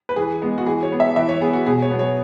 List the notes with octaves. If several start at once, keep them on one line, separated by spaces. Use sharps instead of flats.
B4
E3 G#4
G#3 B3
F#4
E3 G#4
C#5
B3
E5
E3 E5
C#5
B3 G#4
F#4
B2 G#4
C#5
F#3 B3
C#5